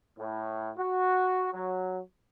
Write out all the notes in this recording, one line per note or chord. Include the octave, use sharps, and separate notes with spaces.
A2
F#4
F#3